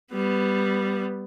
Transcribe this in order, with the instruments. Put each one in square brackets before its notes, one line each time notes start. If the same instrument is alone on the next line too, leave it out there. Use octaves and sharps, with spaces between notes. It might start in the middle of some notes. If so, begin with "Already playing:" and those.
[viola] G3 B3